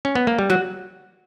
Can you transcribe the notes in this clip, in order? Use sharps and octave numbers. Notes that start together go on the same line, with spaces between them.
C#4
B3
A#3
G3
F#3 F#4